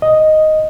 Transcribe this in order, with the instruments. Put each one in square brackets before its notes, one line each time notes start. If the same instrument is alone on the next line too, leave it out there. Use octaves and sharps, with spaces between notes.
[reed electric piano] D#5